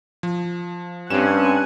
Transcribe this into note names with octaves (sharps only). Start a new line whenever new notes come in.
F3
G2 C4 C#4 F#5 G#5 E7